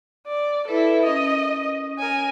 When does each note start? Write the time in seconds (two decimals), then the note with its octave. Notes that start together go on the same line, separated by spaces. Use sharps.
0.27 D5
0.68 E4 A4 B4
1.03 C#4 A#4 D#5 D#6
1.99 A#4 C#5 G#5